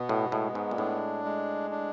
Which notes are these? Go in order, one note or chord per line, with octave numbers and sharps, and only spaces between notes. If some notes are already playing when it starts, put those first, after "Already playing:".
Already playing: B2 B3
A2
A2 G#3
G#2
A#2
A2 D4
G#3
D4